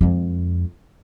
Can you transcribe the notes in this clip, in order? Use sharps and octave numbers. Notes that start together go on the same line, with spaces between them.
F2 G#3